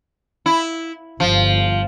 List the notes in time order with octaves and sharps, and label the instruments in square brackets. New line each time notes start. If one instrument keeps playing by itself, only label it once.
[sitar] E4
[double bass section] G1 [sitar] F3